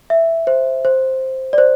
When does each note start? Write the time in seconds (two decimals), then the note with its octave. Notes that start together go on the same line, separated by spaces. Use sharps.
0.10 E5
0.47 C5
0.85 C5
1.53 D5
1.58 C5